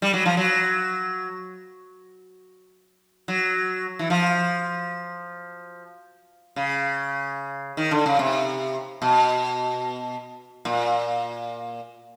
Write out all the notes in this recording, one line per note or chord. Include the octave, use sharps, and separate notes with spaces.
G3
F#3
F3
F#3
F#3
E3
F3
C#3
D#3
D3
C#3
C3
B2
A#2